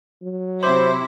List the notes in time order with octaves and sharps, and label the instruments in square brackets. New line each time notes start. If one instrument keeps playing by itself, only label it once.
[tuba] F#3
[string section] C3 E4 [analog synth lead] C5 [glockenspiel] C6 D6